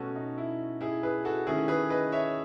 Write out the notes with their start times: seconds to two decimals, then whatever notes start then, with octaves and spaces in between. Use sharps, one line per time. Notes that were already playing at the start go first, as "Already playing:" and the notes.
Already playing: B2 A3 C#4 F#4 A4
0.16 D#4
0.38 E4
0.81 E4 G#4
1.03 G#4 B4
1.25 F#4 A4
1.47 D#3 A3 C#4 E4 G#4
1.68 G#4 B4
1.90 B4 D#5
2.12 C#5 E5